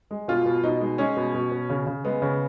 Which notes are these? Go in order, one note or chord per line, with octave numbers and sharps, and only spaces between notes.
G#3
B2 F4
B2
B2 D#4
G#3
G#3 C#4
B2
B2
B2
C#3
C#3
G#3 B3
C#3